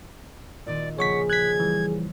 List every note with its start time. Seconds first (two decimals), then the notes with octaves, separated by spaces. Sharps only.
0.66 A#2 D#3 D5 D#7
0.99 C#3 F3 A#3 G#4 C#5 F#5 C#6 B6
1.30 F#6 G#6 B6
1.60 E3 G3